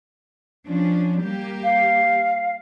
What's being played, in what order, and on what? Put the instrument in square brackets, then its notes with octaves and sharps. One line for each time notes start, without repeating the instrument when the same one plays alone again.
[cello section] F3 C#4 D4
G3 A#3 G4
[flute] F5